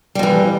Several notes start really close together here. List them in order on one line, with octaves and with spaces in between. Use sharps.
G3 F2 E3